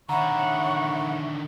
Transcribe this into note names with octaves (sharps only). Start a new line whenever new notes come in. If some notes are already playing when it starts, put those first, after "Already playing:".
D3 D#3 C#5 E5 F#5 A#5 B5 C#6